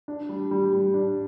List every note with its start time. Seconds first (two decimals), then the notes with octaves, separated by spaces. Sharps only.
0.08 D4
0.29 G3
0.51 G3
0.73 G3
0.94 D4